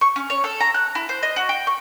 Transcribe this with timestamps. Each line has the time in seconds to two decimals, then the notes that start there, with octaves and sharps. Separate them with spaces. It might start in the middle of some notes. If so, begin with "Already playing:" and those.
0.01 C#6
0.16 C#4
0.30 C#5
0.44 A4
0.61 A#5
0.74 F#6
0.95 E4
1.09 C5
1.23 D#5
1.36 F#4
1.49 G5
1.67 C#6